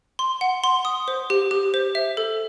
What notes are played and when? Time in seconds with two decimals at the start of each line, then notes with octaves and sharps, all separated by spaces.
0.19 C6
0.41 F#5
0.64 C6
0.85 D#6
1.08 C5
1.30 G4
1.51 G4
1.74 C5
1.95 E5
2.17 A4